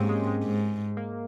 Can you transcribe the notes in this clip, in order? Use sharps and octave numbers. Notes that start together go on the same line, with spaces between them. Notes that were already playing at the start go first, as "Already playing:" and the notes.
Already playing: G#2 A#3 C4 C#4 G4
G#3
G#3
G#2
A#3